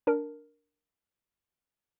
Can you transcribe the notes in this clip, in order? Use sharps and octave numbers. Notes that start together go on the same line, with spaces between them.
D4 A#4